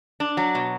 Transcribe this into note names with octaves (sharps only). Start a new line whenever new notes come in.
D4
F#3
B2